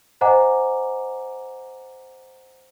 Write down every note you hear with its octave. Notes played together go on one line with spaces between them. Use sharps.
C5 D#5 F#5 G#5 A#5 D6